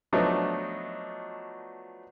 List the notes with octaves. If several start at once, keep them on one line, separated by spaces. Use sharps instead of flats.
F3 F#3 A3 B3 D4 D#4